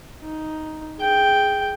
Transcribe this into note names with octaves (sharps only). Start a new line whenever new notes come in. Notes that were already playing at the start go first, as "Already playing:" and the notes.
D#4
G#4 G5